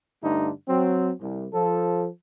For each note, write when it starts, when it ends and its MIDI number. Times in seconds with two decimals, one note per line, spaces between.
0.22 0.50 43
0.22 0.50 50
0.22 0.50 57
0.22 0.50 63
0.68 1.11 54
0.68 1.11 60
1.20 1.46 36
1.53 2.07 53
1.53 2.07 69